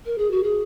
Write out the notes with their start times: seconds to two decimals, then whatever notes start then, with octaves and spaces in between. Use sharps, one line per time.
0.06 A#4
0.18 G#4
0.31 F#4
0.43 G#4